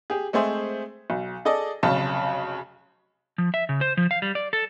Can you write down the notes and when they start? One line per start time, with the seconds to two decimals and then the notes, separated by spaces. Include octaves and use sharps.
0.10 G4 G#4
0.33 G#3 A3 C4 G#4 C5 E5
1.10 B1
1.45 G#4 A4 D5 D#5
1.83 F1 B1 C#3 A5
3.38 F3
3.54 E5
3.69 C#3
3.81 C5
3.97 F3
4.11 F5
4.22 G3
4.35 D5
4.53 A4